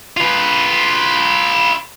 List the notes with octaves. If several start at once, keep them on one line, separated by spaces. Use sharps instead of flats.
F4 B4